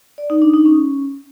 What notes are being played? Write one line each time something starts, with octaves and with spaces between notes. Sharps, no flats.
D5
D#4
D4
D#4
C#4